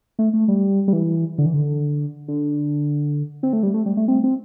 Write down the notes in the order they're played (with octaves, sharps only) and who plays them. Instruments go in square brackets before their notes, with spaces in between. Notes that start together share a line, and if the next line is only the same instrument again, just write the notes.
[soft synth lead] A3
A3
G3
G3
E3
D3
E3
D3
D3
C4
A3
G3
A3
G3
A3
C4
C4